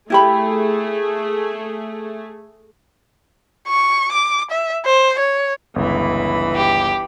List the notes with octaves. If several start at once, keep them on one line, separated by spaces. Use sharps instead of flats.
A3 E4 G4 G#4 B5
C#6
D6
E5
C5
C#5
G1 C#2 E3 B5
G4